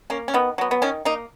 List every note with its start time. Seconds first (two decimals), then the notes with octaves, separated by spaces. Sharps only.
0.10 A#3 C#4
0.28 C#4
0.34 D#3 B3
0.58 F#3 B3
0.71 B3
0.82 D#3 C#4
1.05 A#3 D#4